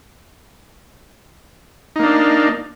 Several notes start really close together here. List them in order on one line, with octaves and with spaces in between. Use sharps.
D#4 A#3 D4